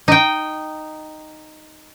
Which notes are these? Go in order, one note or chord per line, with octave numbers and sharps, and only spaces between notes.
D#4 G5